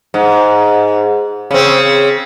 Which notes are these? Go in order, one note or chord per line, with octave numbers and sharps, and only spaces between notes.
G#2
C#3 C4